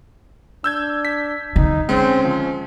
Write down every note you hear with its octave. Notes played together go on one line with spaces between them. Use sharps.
D4 E6 G6 G#6
B6
D3 D#4
G#3 C4 C#4
F3